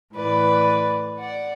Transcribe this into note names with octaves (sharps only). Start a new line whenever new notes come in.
A2 E3 B4 D5
D5 F#5